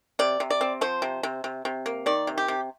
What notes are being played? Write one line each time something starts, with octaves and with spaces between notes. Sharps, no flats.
C3 D5
C3
D5
C4
F3 C5
C3
C3
C3
C3
A#3
D#3 D5
C3
G4
C3